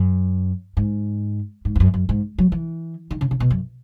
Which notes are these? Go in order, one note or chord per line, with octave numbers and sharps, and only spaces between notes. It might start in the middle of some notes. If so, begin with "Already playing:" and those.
Already playing: F#2
G#2
G#2
E2
F#2
F#2
G#2
F#3
E3
D#3
C#3
C#3
B2
F#2